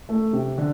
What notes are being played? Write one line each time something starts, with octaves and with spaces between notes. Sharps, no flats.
A3
C3
D3